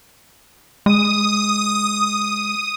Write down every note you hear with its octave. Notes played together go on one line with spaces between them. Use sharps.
G#3 D#6